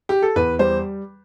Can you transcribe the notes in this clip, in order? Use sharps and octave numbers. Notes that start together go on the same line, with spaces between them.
G4
A4
E2 B4
G3 C5